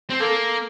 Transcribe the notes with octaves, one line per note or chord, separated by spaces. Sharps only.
C4
A#3 A4